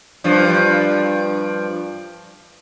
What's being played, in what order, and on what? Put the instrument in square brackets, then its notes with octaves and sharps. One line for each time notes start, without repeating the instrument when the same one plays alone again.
[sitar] G2 F3